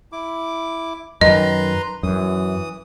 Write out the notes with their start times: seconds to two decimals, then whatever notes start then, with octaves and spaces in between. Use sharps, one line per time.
0.12 E4 D6
1.21 F#2 D#3 B4 D#5 A#5 C6
2.03 F#2 E3 D#6